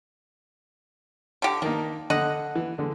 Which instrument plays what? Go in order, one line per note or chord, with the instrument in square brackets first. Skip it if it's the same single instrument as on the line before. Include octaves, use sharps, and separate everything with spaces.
[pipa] D3 G4
[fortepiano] D#3 A#3 D#4 [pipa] D4
[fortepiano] D3 [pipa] D#5 F#5
[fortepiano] E3
D3 G#3